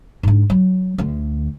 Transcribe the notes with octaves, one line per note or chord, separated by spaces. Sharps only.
G#2 D4
F#3
D2 D3